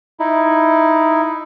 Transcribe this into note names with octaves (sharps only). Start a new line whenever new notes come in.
D#4 E4